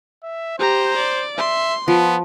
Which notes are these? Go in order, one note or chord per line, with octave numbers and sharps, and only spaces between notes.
E5
G4 C5 A#5
D5
E5 C6
F3 B3